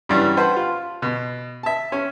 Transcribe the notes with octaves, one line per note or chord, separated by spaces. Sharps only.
G2 C#3 E3 F#3 G3
B4 C5 F#5 A5
F4
B2
E5 A5
C#4